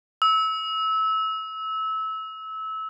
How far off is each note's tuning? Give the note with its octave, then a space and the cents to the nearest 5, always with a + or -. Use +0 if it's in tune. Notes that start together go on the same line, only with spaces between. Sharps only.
E6 -25